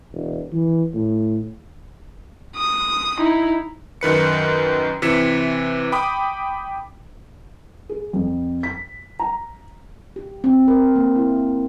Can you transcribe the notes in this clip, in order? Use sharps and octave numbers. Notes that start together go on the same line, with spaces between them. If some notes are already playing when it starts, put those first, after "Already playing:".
E1
E3
A2
D#6
D#4 E4
F#2 D#3 B4 C#7
C3 E3 B6 C#7 E7
G5 B5 D6 D#6
G#4
F2
B6
A#5
G4
C4
A#4
A#3
E4